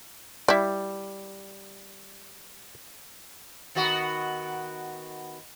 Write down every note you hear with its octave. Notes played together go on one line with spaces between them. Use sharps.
G3 E4 D5
D#3 B3 F#4